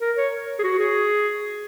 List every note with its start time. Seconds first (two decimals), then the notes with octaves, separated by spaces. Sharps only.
0.01 A#4
0.17 C#5
0.59 G#4
0.64 F#4
0.79 G#4